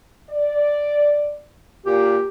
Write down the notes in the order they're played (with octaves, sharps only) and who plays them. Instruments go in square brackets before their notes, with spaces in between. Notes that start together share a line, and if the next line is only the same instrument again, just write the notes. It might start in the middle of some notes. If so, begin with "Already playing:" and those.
[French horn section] D5
[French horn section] A#2 [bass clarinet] G4